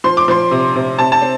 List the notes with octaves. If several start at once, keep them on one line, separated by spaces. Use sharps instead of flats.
F3 C6
D6
F3 C6
C3
C3
C3 A5
A5
C4